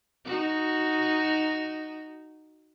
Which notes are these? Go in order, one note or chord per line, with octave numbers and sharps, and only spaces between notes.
D#4 F#4